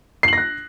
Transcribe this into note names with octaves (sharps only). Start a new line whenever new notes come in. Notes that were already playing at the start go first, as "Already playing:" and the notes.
F#6 A#6 C7 F#7